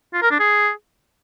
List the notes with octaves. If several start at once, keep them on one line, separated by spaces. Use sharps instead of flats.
F4
A#4
D4
G#4